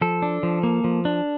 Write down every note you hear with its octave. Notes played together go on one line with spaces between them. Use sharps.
F3 A4
D4
F3
A#3
F3
D4